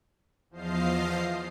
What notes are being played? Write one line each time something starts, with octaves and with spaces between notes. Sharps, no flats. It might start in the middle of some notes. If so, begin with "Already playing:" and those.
E2 F3 C5 D#5 F5 C7